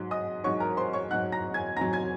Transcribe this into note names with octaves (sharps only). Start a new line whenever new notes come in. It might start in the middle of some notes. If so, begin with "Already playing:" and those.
Already playing: G#2 F#3
D#5 D#6
G#2 F#3 C#5 C#6
A#4 A#5
C5 C6
C#5 C#6
G#2 F#3 F#5 F#6
A#5 A#6
G#5 G#6
G#2 F#3 A#5 A#6
G#5 G#6